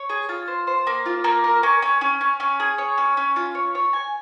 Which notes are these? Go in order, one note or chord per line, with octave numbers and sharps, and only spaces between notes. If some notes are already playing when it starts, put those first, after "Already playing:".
Already playing: C#5
G#4
F4
C5
C5
A#3
F4
A#3
A#4
C#4
C#4
C#4
C#4
C#4
G#4
C#5
C#4
C#4
F4
C#5
C#5
G#5